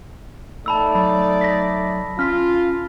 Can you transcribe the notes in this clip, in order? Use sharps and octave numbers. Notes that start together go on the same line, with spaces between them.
A3 D#4 D5 A5 B5 E6
F#3 B5
A#6 B6
C#4 F4 F6 B6